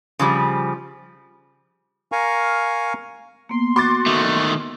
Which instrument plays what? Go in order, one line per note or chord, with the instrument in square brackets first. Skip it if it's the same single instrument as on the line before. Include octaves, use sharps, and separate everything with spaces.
[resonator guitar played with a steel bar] C#3 F3 G3
[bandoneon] A#4 F5 G#5 A#5 C#6
[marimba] A#3 B3 [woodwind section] C6
[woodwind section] F#4 [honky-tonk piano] C6 D6 A6
[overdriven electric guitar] D#3 A3